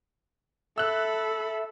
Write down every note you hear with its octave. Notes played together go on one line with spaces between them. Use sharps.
A4 E5 B5 E6 F#6